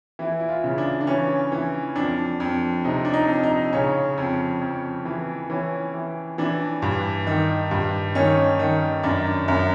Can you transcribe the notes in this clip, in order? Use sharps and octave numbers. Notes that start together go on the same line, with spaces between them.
E3 E4
E4
F4
C#3
D4
D4
E3 C#4
E3
F2 D4
F2
C3 D#4
D4
D#4
F2
D#4
C#3 C#4
F2
F2
E3
E3 C#4
E3
E3 D4
G2
D#3
G2
D#3 C#4
D#3
F#2 D4
F#2